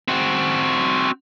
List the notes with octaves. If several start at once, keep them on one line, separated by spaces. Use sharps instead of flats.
C4 F#4